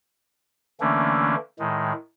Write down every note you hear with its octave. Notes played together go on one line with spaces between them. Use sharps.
D3 E3 A3 A#3 C#4 D4
A2 D#3 G#3